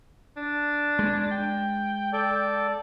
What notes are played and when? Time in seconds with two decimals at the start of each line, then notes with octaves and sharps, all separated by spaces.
0.37 D4
0.99 G#3
1.31 G5
2.13 A4 D5